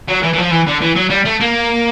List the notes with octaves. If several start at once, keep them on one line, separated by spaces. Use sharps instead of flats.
F#3
E3
E3
F3
E3
D3
E3
F#3
G3
A3
A#3